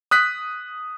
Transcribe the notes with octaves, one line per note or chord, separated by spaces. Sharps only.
D#6 F#6 B6